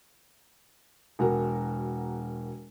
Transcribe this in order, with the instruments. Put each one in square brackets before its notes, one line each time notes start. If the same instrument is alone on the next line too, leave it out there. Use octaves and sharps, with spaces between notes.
[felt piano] E1 F#4 A#4